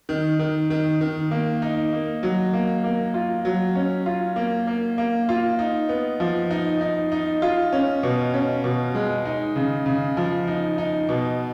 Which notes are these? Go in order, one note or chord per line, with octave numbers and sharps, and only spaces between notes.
D#3
D#3
D#3
D#3
A#3
D#4
A#3
F#3
A#3
A#3
F4
F#3
C#4
F4
A#3
A#3
A#3
F4
D#4
B3
F3
D#4
D#4
D#4
F4
C#4
B2
C#4
B2
G#3
D#4
C#3
C#3
F3
D#4
D#4
B2